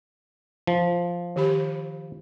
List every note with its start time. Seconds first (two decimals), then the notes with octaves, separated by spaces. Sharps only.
0.67 F3
1.36 D#3 G4 B5